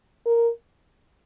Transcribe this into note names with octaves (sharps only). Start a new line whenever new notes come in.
A#4